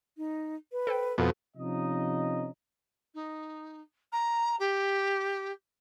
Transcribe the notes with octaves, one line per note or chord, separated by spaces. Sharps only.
D#4
B4
A4 C5 G5
F2 B2 F#4 A4
C3 F3 C#4 D#4 D#5
D#4
A#5
G4